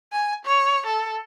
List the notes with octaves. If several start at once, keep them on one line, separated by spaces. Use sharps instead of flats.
G#5
C#5
A4